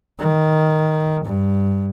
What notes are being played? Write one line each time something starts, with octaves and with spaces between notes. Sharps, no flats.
D#3
G2